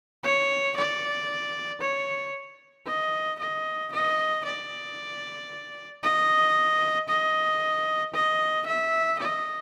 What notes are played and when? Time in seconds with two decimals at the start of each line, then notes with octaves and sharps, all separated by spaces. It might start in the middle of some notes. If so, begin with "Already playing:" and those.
0.24 C#5
0.77 D5
1.81 C#5
2.87 D#5
3.40 D#5
3.93 D#5
4.45 D5
6.03 D#5
7.09 D#5
8.14 D#5
8.67 E5
9.19 D#5